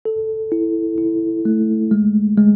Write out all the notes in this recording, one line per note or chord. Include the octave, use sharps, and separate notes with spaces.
A4
E4
E4
A3
G#3
G#3